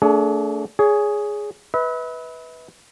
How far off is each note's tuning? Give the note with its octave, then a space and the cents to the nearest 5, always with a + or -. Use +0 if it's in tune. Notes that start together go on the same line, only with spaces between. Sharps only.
A3 +25 D4 -20 G#4 +30
G#4 +0 C#5 +30
B4 +0 E5 -45